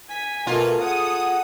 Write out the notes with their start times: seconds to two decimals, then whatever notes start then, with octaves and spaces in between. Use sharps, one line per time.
0.10 G#5 B6
0.47 B2 A3 A#3 F4
0.81 G#4 A4 F#5 D#6